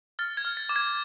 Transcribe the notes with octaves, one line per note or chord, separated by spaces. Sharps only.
F6 A6
G#6
F6
A6
D6
G#6